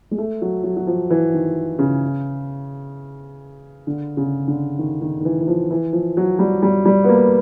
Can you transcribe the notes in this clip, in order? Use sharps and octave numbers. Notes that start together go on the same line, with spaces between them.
G#3
A3
F#3
F#3
F#3
F3
E3
D#3
C#3
D3
C#3
D3
D#3
D#3
D#3
E3
E3
F3
E3
F3
F#3
G3
G3
G3
B3
A#3